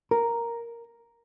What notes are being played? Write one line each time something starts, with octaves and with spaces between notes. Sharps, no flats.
A#4